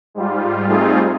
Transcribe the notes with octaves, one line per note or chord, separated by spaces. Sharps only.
G#2 G3 F4
G3 A3 C4 D#4 F4 G#4